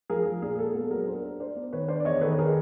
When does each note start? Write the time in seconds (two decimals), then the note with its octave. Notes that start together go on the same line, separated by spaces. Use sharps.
0.10 F3 G#4 A#4
0.25 F3
0.42 A#2 G#4
0.58 G#3 A4
0.74 B3 A4
0.90 F#3 G#4 A#4
1.07 D4 A#4 C5
1.24 D4
1.40 D4 C5 D5
1.56 B3
1.73 D#3 B4 C#5
1.88 D4 C5 D5
2.00 D5
2.05 E2 C#5 D#5
2.21 D#3 A4 B4
2.39 G#4 A#4